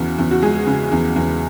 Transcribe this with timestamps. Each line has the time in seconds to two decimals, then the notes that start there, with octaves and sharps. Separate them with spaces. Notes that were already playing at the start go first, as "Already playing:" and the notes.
Already playing: E2 C#3 F#4
0.18 E2
0.31 F#4
0.42 G#3 G#4
0.67 C#3
0.91 E2
1.16 E2